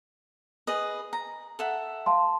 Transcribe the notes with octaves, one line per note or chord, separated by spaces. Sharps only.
G#4 B4 D#5
A#5
A4 E5 F#5
F5 A5 C6